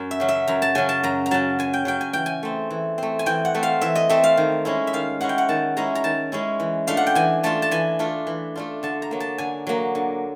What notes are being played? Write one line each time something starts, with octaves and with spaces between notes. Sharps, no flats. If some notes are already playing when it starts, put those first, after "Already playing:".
Already playing: F#2
E5
C#3 F#3
E5
F#2 A#5
A5
C#3 F#3 G#5
A5
F#2 A#5
A#5
C#3 F#3 A5
F#2 G#5
G5
C#3 F#3 G5
G#5
E3 G5
G#5
A3 C4
E3
A3 C4
G#5
E3 G5
F#5
A3 C4
F5
E3 E5
D#5
A3 C4 E5
F5
D#3
G#3 C#4 E4
E5
D#3 F5
G#3 C#4 E4 F#5
G5
F#5
D#3 A5
G#3 C#4 E4 A#5
A#5
D#3 A5
G#3 C#4 E4
E3
A3 D4 F4 F5
F#5
G5
E3 G#5
A3 D4 F4 A5
A5
E3 G#5
A3 D4 F4
E3
A3 D4 F4
D3 A5
A#5
F#3 A#3
A5
D3 G#5
F#3 A#3
D3